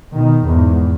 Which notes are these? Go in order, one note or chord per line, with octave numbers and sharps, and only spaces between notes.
B2 D#3
E2 G#2